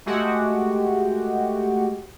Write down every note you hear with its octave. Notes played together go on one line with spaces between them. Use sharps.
G#3 A3 F#4 G4